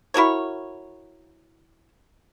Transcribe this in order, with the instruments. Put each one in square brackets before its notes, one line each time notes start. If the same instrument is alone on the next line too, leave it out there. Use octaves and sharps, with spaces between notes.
[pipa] E4 F#4 A#4 C#5